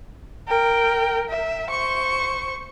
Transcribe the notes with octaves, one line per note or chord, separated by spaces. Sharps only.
A#4 G5
E5
C5 C#6